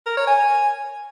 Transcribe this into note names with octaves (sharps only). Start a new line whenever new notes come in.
A#4
C#5
G#5